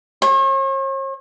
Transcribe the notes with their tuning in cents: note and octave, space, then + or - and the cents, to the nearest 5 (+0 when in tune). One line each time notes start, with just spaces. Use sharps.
C#5 -45